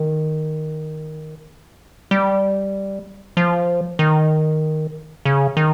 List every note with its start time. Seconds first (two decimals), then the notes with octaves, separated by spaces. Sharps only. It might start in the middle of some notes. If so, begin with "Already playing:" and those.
Already playing: D#3
2.11 G3
3.37 F3
3.99 D#3
5.25 C#3
5.57 D#3